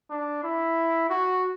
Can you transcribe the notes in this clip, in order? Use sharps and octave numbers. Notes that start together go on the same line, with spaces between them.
D4
E4
F#4